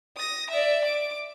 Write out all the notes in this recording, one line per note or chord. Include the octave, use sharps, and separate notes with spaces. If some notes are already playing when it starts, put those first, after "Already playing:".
D#6 A#6
D5 E5
D6